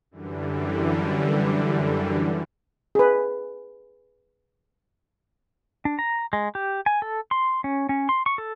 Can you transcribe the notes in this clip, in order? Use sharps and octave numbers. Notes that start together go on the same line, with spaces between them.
F#2 D3 E3 G3
G#4 B4
D4
A#5
G#3
G4
G#5
A4
C6
C#4
C#4
C6
C#6
A4